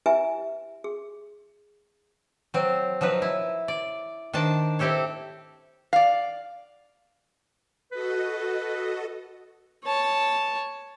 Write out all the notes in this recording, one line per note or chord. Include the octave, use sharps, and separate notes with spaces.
E4 G4 B4 E5 G#5
G#4
F#3 C4
F3 F#3 D#4 B4
E4
D5
D#3 D4 C5 A5
C4 E4 G4 A4 C#5
D5 F5
F#4 A4 B4 D#5
C#5 A5